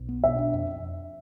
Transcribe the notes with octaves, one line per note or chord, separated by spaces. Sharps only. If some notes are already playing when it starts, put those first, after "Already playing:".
Already playing: B1
B3
B2 E5
D4
F2